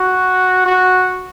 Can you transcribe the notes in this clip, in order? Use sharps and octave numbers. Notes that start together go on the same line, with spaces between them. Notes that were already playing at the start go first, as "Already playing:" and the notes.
Already playing: F#4
F#4